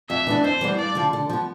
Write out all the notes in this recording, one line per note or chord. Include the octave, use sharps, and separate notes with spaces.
F2 E5
E3 B3 D4
F2 C5
E3 G3 B3
G2 D5
D3 F3
D3
F3 B3